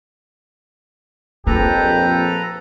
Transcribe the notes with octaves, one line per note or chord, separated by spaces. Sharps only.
A#1 F2 F3 A#3 G4 A4 B4 A#5